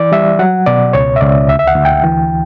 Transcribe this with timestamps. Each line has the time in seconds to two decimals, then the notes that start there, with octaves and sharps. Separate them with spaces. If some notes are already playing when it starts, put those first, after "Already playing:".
Already playing: E3 D5
0.12 G3 E5
0.39 F#3 F#5
0.66 B2 D5
0.93 C#2 C#5
1.16 E5
1.21 C#2 D5
1.48 D2 E5
1.59 E5
1.67 F#5
1.75 D2
1.85 G5
2.04 E3